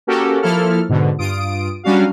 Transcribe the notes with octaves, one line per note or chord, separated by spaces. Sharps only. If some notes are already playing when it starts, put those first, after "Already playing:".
A#3 C#4 F#4 G4 A4 A#4
F3 A#3 E4 A4 F6
G#2 B2 D3
G2 F4 D#6 D7
F#3 G3 C#4 D4 F#4 F5